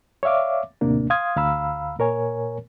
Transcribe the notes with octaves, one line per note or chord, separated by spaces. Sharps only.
C#5 D5 E5 F5 D6
D#2 A2 C3 A#3 D4
F5 C6 D#6 G#6
D2 F5 A#5 B5 E6
A#2 A#4 C#5 G#5